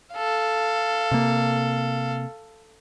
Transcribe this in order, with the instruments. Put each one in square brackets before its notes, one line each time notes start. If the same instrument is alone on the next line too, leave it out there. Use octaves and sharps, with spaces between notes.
[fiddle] A4 F5
[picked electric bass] C3 A#3